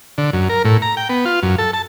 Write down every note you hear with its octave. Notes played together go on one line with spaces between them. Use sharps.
D3
F#2
A#4
A2
A#5
G5
B3
F4
F#2
A4
A5